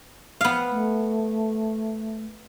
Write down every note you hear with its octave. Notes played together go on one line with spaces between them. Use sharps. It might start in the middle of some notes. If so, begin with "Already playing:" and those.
B3 F5
A3